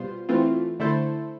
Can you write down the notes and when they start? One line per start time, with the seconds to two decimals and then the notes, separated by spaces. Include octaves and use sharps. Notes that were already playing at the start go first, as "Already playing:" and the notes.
Already playing: B2 G3 B3 F4 C5
0.29 E3 A3 C4 F4
0.80 D3 A3 E4 A4 C5